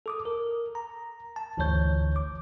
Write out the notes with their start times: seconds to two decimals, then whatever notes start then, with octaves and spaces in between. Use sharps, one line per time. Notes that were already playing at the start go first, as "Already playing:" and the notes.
0.06 A4 D6 D#6
0.25 A#4
0.75 A#5
1.36 A5
1.57 G1 D2 D3 E3 C#5 G6
2.16 D6